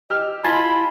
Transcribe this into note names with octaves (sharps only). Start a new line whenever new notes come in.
G4 D#5 E6 F6
E4 F4 D#5 G#5 A5 B5 C6